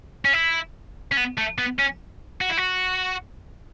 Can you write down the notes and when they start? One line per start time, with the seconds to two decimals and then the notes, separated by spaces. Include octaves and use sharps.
0.25 C#4
0.33 E4
1.12 C#4
1.17 B3
1.38 A3
1.58 B3
1.79 C#4
2.41 F#4
2.50 E4
2.57 F#4